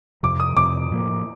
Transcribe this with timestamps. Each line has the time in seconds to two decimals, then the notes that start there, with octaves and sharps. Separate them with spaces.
0.23 F2 C3 F3 D6
0.40 D#6
0.56 F2 C3 F3 D6
0.91 A2 F3 A#3